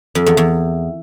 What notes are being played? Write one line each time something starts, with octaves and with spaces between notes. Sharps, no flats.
F2
E2
E2